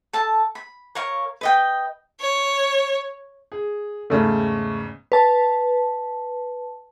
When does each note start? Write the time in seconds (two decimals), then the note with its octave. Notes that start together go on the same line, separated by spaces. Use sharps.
0.13 A4 A5
0.55 B5
0.95 A#4 C#5 F5 C#6
1.41 B4 D#5 G5
2.21 C#5
3.52 G#4
4.10 E2 G#2 C#3 A3 C#4
5.12 B4 A5